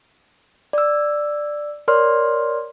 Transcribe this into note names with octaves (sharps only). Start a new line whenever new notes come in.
D5 E6
A#4 C#5 D5 C6 F6